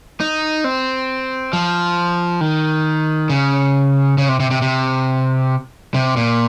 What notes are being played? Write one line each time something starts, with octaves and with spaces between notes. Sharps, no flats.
D#4
C4
F3
D#3
C#3
C#3
C3
C3
C3
C3
C3
A#2